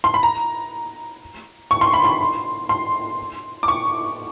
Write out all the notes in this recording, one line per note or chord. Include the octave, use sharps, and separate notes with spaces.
C6
B5
A#5
C#6
C6
B5
C6
C6
D6
C#6